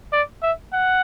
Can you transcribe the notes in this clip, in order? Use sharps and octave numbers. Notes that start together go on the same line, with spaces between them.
D5
E5
F#5